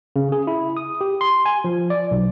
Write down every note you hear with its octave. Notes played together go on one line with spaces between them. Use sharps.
C#3
G#4
E4
D#6
G4
C6
G#5
F3
D5
B1